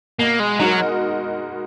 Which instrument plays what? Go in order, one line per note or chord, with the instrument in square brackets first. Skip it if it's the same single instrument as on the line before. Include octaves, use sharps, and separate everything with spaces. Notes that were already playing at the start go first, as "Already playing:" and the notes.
[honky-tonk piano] B2 [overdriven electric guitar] A#3
[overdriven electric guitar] G#3
[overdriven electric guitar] F#3 [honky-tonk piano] G#3 D#4 F#4 A#4